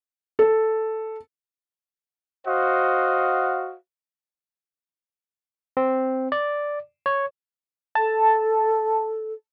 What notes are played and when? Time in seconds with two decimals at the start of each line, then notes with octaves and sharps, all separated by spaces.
0.39 A4
2.47 F#4 C5 D#5 F5 F#5
5.77 C4
6.32 D5
7.06 C#5
7.95 A4 A5